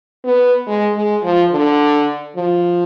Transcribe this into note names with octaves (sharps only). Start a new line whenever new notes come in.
B3
G#3
G#3
F3
D3
F3